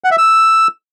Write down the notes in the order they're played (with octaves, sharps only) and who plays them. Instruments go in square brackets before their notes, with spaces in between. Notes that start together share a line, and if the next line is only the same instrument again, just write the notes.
[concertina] F#5
E5
E6